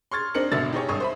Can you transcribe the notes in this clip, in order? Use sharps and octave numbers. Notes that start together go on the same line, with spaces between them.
C6 C#6 F6 G#6 A6
C4 D4 D#4 C#7 F#7
G#1 B2 D3 E5 E6 A6
D#4 G4 G#4 C#5
G#1 G2 C#6 D#6
C5 E5 B5